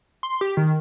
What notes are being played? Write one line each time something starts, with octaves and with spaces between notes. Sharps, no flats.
C6
G4
D#3